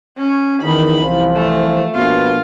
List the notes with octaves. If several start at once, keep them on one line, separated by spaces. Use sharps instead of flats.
C#4
E2 D#3 D#4 B5
C2 E3 F3
A3
A#1 B2 B3 F4